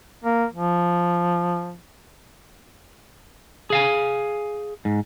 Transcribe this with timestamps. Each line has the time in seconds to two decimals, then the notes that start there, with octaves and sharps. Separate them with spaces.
0.24 A#3
0.52 F3
3.70 G#4 F5 G#5
4.85 G#2